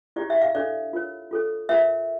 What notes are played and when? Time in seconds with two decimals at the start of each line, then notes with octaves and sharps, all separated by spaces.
0.16 E4 G4 C#5 D5
0.30 E5
0.42 F5
0.55 D4 A4 C#5 D5
0.93 F4 A#4 C#5
1.31 F4 A4 C#5
1.69 F4 A#4 C#5 E5